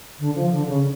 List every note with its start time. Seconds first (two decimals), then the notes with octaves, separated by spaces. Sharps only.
0.19 D3
0.35 F3
0.51 D3
0.67 C#3